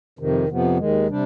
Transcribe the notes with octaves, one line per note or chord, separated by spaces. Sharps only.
F2 C3 D#3
F2 C3 F3 B3
D#2 D#3 G#3
C3 G3 D4